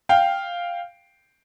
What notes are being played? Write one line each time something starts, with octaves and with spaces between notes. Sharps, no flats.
F5 G5